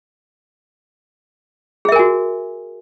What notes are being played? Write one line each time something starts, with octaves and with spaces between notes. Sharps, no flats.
F#4 G#4 A#4 E5 G#5